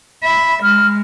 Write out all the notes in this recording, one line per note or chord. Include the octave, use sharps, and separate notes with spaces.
E5 B5
G#3 F6